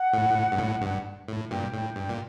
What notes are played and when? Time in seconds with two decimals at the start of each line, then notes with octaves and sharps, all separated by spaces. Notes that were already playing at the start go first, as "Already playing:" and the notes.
Already playing: F#5
0.13 A2
0.52 G2
0.59 A2
0.82 G2
1.28 A2
1.51 G2 A#2 G5
1.73 A2
1.96 G2
2.09 A#2